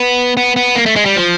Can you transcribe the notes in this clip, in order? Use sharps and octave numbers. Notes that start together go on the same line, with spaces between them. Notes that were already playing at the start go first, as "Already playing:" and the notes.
Already playing: B3
B3
B3
A#3
A3
G#3
G3
F3